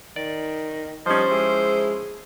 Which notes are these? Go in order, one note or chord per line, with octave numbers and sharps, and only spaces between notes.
D#3 D5
F3 G3 C#4 D#4 C5
G#3 E4 G#4